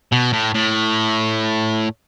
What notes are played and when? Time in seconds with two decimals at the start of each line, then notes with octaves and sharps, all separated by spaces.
0.12 B2
0.33 A2
0.54 A2